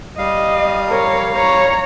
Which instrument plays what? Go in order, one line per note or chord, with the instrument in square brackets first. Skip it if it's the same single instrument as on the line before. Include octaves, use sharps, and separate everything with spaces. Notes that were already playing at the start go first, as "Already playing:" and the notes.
[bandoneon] G3 F5 [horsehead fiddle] D#5
[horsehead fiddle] A#4 C#5
C#5 A#5